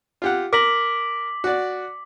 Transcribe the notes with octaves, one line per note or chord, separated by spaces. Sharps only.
F4 G4 F#5
A#4 D6 B6 F#7
F#4 D5